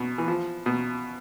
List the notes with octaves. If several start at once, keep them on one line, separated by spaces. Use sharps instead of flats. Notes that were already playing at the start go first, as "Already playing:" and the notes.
Already playing: B2
E3
F3
B2